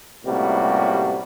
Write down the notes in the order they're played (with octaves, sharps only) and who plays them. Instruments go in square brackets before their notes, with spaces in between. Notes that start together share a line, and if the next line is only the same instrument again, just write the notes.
[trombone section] C#2 A2 C3 G3 A#3 F#4